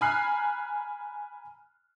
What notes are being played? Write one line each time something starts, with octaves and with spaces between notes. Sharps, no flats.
G#5 A#5 B5 F6 F#6 C7